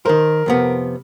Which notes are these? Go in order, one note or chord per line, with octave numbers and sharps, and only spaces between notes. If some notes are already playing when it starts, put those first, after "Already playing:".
D#3 A#4 C5
F2 C3 B3